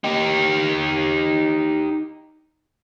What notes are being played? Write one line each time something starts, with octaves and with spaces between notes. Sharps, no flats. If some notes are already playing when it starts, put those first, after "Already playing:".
D#4 G4